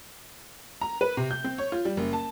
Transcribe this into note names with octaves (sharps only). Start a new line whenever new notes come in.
A#5
B4
C3
G6
C4
C#5
F4
G3
F#1
A5